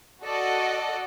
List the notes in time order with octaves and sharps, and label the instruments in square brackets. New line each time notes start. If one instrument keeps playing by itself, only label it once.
[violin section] F#4 A4 D5 D#5 F#5